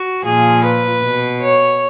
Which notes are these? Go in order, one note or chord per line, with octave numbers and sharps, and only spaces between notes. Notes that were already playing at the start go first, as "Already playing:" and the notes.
Already playing: F#4
A#2 F3 G#4
B4
B2
C#5